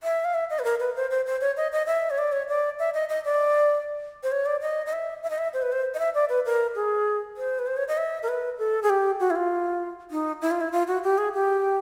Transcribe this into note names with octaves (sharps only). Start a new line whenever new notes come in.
E5
F5
E5
D#5
B4
A#4
B4
C5
C5
C5
C#5
D#5
D#5
E5
C#5
D5
C#5
D5
E5
D#5
D#5
D5
C5
C#5
D5
D#5
D#5
E5
E5
D#5
E5
C5
B4
C5
D#5
E5
D5
B4
A#4
G#4
C5
B4
C5
C#5
D#5
E5
A#4
B4
A4
G#4
G4
F#4
E4
F4
D#4
E4
F4
E4
F4
F#4
G4
G#4
G4